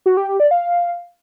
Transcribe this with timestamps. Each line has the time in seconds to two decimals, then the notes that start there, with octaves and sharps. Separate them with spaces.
0.06 F#4
0.17 G4
0.28 G4
0.40 D5
0.51 F5